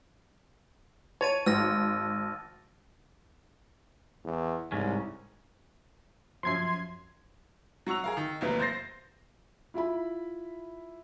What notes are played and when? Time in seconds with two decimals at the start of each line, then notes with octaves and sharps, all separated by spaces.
1.21 C#5 A5 A6 D#7
1.46 G#1 E6 F6 A#6
4.25 E2
4.72 C2 G#2 C#4
6.43 F#2 F3 C6 G#6 C7
7.87 F#3 F#4 C#6 E6 F7
8.04 G#4 A#4 F5
8.17 D#3
8.41 F1 E2 F#3 A#3 B4
8.60 C5 G6 A6 A#6 C7
9.74 E4 F4 E5 B5